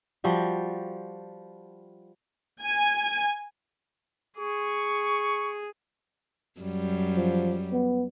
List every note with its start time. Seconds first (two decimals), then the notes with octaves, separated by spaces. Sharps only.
0.24 F3 G3 F#4
2.61 G#5
4.38 G#4 C#6
6.60 F#2 G3
7.17 F3
7.72 B3